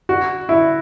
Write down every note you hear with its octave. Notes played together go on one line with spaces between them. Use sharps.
F#4
E4